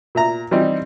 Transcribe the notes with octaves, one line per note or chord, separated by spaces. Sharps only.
A#2 E5 A#5
E3 G3 C4 D#4